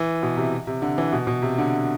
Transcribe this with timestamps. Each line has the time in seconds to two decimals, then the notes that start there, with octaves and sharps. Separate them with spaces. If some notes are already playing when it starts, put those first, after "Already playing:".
Already playing: E3
0.23 B2
0.37 C3
0.67 C3
0.82 D3
0.98 E3
1.13 B2
1.27 B2
1.42 C3
1.58 D3